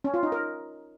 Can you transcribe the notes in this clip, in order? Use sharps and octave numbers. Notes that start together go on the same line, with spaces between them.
C#4
F4
D#4
A#4